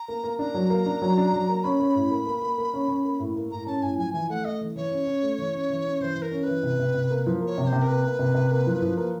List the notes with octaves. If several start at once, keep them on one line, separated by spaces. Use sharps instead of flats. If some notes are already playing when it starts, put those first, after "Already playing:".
Already playing: A#5
A#3
A#3
D4 A#5
F#3
A#3
D4
F#3
D4
F#3
A#3
C#4 B5
C#4
A2
A#3
A#3
A#3
A#3
C#4
C#4
A#3
A2
A#3
A2 A#5
C#4 A5
A2 G#5
F3 G#5
E3 G#5
A3 F#5
A3 D#5
E3
E3 C#5
C#4
C#4
A3
E3
C#4
E3
C#4
E3 C5
E3
A#4
C#4
E3 B4
C3
C3
C3
A#3
F3
A#3
C#5
C3
C5
C3
A#4
A#3 B4
A#3
C3
C3
A#3
F3
F3
A#3